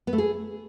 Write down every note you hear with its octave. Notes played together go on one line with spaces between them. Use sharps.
B3
A3
G#4